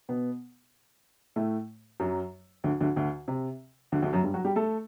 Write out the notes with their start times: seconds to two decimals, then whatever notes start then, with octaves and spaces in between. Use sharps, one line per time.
0.09 B2 B3
1.36 A2 A3
2.00 F#2 F#3
2.64 D2 D3
2.80 D2 D3
2.96 D2 D3
3.28 C3
3.92 D2 D3
4.02 D2 D3
4.13 F#2 F#3
4.23 G2 G3
4.34 F#3 F#4
4.45 G3 G4
4.56 A3 A4